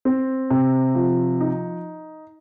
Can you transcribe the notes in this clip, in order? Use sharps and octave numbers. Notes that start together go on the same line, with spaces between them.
C4
C3
F3
D#4